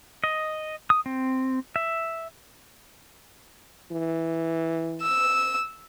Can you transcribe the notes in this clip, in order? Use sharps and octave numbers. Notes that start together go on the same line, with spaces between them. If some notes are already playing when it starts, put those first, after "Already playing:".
D#5
D#6
C4
E5
E3
E6